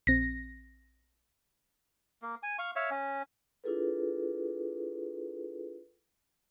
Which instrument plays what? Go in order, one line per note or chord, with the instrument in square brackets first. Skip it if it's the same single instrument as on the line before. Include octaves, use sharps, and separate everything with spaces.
[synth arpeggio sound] A#1 C4 [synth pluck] A#6
[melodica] A#3
G#5
F5 C#6
C#5 E5 F5
C#4
[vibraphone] D4 E4 F4 G#4 A4 B4